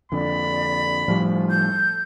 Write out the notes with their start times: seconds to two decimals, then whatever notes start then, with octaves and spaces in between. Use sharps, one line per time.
0.12 F2 D3 D5 B5
1.08 A2 F3 G3
1.49 A4 G6